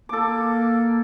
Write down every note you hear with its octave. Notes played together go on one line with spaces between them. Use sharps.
A#3 A4 D6